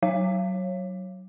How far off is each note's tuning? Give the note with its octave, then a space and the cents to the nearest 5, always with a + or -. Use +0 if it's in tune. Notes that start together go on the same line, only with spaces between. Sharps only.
F#3 +20 C#5 -25